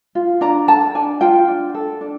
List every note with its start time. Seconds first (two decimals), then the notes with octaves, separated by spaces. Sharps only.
0.15 F4
0.41 D4 A#5
0.67 A4 A5
0.95 D4 G#5
1.21 F4 G5
1.48 D4
1.75 A4
2.01 D4